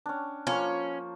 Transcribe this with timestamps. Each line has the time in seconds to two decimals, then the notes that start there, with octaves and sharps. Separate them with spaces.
0.06 C#4 D4
0.47 F3 A#3 C#4 C#6